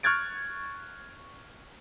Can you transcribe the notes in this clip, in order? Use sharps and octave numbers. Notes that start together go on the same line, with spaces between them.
C#6 F6 F#6 G#6 A6 D7